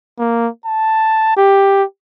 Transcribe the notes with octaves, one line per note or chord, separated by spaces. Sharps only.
A#3
A5
G4